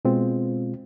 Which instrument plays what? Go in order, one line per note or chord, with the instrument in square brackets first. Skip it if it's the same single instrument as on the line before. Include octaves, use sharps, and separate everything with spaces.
[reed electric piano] B2 G#3 C4 F4